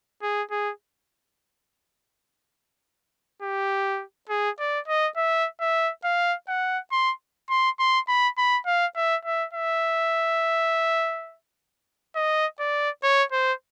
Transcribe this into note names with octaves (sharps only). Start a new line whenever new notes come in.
G#4
G#4
G4
G#4
D5
D#5
E5
E5
F5
F#5
C6
C6
C6
B5
B5
F5
E5
E5
E5
D#5
D5
C#5
C5